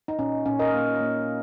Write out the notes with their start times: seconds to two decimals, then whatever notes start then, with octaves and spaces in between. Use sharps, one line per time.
0.08 D#4
0.18 A#2 C#4
0.46 A#2 C#4
0.59 A#4 D#5
0.74 A#3
1.01 A#3